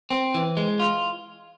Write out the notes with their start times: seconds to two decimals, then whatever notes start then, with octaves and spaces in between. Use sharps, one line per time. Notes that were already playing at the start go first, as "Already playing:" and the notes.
0.10 C4
0.34 E3
0.57 G#3
0.80 F4